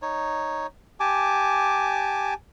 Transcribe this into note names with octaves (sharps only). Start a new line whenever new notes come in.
D#4 C#5
G4 G#5 A5 D6